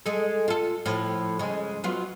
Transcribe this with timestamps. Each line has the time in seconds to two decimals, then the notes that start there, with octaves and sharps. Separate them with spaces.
0.06 G#3 A4
0.48 F4 A4
0.86 A2 F3
1.39 C#3 G#3
1.84 F#3 B3 F4